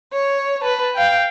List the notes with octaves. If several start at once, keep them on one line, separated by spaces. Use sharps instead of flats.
C#5
B4 A5
F5 G5